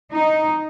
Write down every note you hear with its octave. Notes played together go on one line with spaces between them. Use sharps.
D#4